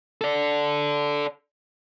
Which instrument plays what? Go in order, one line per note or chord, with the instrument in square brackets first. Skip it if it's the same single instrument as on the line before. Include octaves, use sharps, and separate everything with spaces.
[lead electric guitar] A4 D5